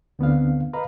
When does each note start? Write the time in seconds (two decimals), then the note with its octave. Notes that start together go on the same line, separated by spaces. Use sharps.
0.19 D2 D3 B3 C4 D4 F5
0.73 B4 D#5 F5 A#5 B5